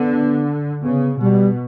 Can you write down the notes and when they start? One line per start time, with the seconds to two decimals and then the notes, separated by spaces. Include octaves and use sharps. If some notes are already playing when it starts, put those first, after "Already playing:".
Already playing: D3 B3
0.83 C#3 B3
1.21 B2 G3